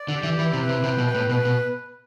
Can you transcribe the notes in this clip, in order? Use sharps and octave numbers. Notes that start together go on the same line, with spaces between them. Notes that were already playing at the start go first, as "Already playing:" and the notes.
Already playing: D5
D3
G4
E3
E3 E4
C3
B4
C3
C3 G5
B2
B4
A2
B2 B4
B2